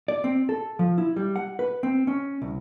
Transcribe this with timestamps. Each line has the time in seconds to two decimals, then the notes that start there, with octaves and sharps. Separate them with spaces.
0.08 D5
0.24 C4
0.49 A4
0.79 F3
0.98 E4
1.16 G3
1.36 F#5
1.59 B4
1.83 C4
2.07 C#4
2.42 C2